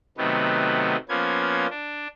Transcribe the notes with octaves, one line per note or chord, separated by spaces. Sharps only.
C3 D#3 F#3 A3 B3
F3 A#3 B3 C#4 G#6
D4